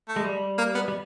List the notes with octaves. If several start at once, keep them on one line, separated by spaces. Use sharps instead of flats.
A3
G#3
G3
A#3
B3
G3